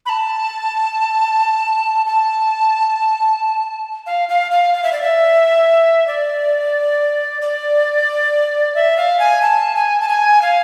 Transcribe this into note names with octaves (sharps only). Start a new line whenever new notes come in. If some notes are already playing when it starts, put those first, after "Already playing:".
B5
A5
A5
F5
F5
F5
F5
E5
D5
E5
D5
D5
E5
F5
G#5
A5
G#5
A5
G#5
F5